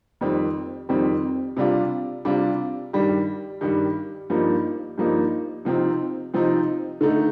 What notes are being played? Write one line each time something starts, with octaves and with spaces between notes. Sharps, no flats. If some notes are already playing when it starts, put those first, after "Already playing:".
F2 D#3 G3 C4
F2 D#3 G3 C4
C3 G3 D4 F4
C3 G3 D4 F4
G2 D#3 G3
G2 D#3 G3
G2 F3 A#3 D#4
G2 F3 A#3 D#4
C3 F3 C4 D#4
C3 F3 C4 D#4
D3 A3 D#4